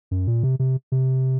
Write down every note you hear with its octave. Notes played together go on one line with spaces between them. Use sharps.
F#2
A#2
C3
C3
C3